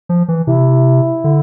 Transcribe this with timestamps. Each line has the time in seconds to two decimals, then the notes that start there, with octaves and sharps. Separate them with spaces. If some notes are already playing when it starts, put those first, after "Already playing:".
0.09 F3
0.28 E3
0.47 C3 E4
1.24 D3